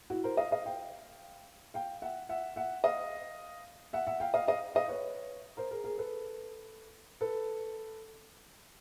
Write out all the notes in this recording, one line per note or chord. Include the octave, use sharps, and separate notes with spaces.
E4 F#4
A#4 C5
D#5 F5
D#5 F5
F5 G5
F5 G5
E5 F#5
E5 F#5
E5 F#5
D#5 F5
E5 F#5
E5 F#5
F5 G5
D#5 F5
D#5 F5
D#5 F5
B4 C#5
A#4 C5
G#4 A#4
G#4 A#4
A4 B4
A4 B4